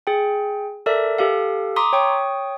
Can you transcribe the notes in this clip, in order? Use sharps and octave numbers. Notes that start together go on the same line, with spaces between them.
G#4 G5
A4 A#4 D5 E5
G4 A4 F5
A#5 C6 D6 D#6 B6
C#5 G5 C#6 D#6